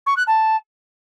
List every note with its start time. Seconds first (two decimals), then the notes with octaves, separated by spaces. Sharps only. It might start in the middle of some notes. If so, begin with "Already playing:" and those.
0.06 C#6
0.17 F#6
0.27 A5